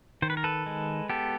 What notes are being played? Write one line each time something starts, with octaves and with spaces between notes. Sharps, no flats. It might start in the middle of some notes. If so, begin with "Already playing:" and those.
D#3 C5
B4
A#4
A4 B4
G#3
B3 G4 A4